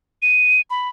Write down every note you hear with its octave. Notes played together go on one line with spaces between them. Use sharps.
D#7
B5